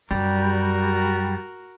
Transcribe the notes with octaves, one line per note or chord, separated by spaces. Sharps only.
F#2 G3 F#4 A#4